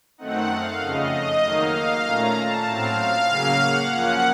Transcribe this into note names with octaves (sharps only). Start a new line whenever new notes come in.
F#2 D#3 A3 C4 D#4 F#5
F5
F2 C#3 A3 D#5
D#3 F#3 A#3 D#4 F5
A#2 A3 C#4 A#5
A5
A2 F#3 C4 F5
C#3 F#3 A#3 C#4
F#5
F#2 F3 A#3 C#4